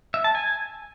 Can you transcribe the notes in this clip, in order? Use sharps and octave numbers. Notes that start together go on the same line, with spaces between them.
E5
A5
G#5